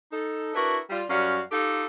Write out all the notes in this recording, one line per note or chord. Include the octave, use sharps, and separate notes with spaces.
D#4 A4
D4 E4 F#4 A#4 B4
G3 F4
F#2 G3 C#4 F#4 F5
D#4 F4 G4 A4